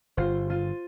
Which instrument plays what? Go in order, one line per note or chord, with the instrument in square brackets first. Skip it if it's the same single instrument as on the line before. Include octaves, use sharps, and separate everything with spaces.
[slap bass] G1 [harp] F4 C5
[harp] F4 A6 D#7